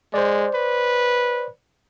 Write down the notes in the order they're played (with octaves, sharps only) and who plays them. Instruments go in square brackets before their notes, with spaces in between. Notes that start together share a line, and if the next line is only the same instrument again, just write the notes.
[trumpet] G#3 [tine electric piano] C5 D5
[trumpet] B4